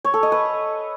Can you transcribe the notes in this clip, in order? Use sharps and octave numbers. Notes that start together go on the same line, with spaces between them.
C#5
A4
D#5
B4